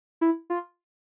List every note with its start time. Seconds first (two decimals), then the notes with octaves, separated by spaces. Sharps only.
0.21 E4
0.50 F4